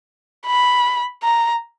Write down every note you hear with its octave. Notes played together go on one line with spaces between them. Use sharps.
B5
A#5